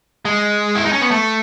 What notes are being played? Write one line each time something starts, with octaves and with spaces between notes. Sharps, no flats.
G#3
E4
D#4
C#4
B3
A3